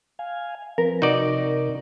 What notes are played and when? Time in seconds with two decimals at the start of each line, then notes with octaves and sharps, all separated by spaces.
0.19 F5 G#5
0.78 F3 C4 A#4 B4
1.02 C3 D#4 F#4 D5